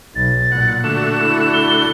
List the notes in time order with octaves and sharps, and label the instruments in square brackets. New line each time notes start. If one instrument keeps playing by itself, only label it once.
[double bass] B1 [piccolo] A6
[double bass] A#2 [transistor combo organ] F#5
[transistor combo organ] D3 A3 F#4 [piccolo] E7
[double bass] E4
[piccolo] G7